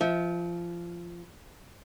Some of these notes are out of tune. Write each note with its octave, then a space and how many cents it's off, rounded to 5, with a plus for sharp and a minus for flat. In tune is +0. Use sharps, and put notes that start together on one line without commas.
F3 -20 E5 -40